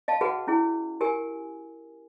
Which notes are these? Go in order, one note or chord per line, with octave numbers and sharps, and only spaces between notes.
D#5 F5 A5
F#4 G#4 B4 F#5
C#4 E4 G#4
G4 A#4 G#5